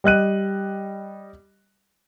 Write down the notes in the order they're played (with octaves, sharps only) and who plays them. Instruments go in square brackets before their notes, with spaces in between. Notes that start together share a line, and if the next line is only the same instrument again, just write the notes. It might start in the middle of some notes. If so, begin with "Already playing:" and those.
[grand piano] G3 D#5 F#6 D#7